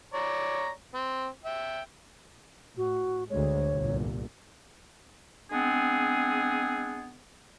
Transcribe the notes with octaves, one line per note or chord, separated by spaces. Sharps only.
C#5 D5 A#5
C4
E5 G5
A2 F#4
D2 G#3 C#5
G1 C2 A#2
G#3 B3 C4 D4 G#4